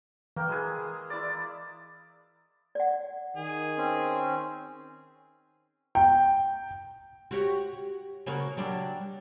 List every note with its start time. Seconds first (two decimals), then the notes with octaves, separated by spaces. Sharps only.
0.36 E3 A#3 G5
0.49 G#3 E4 G#4
1.10 E4 D5
2.75 D5 F#5
3.37 D#3 G#4
3.77 C4 C#4
5.95 G5
7.31 F#4 G4 C#5
8.26 C#3 A#3 F#4
8.57 F#3 G3 D4